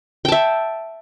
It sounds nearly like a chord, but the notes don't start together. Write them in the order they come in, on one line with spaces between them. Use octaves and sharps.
G5 A5 E5